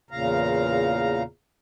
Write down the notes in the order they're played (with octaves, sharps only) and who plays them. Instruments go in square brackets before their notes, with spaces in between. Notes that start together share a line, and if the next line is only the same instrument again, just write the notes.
[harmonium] E2 A#2 C#3 F5 A#5